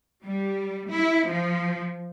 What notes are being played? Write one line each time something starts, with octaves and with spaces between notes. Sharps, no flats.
G3
E4
F3